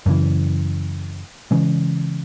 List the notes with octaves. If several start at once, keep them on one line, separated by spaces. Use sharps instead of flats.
F#2 C#3 E3
C#3 E3 G#3 C#4